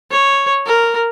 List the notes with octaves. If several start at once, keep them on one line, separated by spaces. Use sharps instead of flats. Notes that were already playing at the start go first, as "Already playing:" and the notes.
C#5
A#4